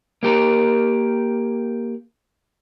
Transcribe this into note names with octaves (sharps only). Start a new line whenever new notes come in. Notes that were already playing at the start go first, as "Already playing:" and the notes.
A#3 G4 A#4